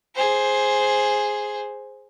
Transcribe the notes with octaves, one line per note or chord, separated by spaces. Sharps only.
G#4 C5